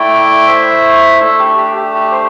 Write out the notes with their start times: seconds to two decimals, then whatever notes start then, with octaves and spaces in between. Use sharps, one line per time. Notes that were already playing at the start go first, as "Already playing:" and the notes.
Already playing: A3 E4 D5 G5
0.47 C5 E5
1.20 A3 D4 A4
1.39 G4
1.57 G4
1.76 G4
1.94 G4
2.12 C5